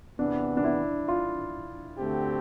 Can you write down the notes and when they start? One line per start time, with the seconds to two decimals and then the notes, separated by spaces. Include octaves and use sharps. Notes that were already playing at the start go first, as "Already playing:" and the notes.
0.19 E2 C3 E3 B3 D4
0.57 D4
0.64 E4
1.08 F4
1.98 D2 D3 A3 C4 G4